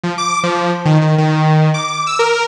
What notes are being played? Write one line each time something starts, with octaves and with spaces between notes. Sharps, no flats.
F3
D6
F3
D#3
D#3
D#3
D6
E6
A#4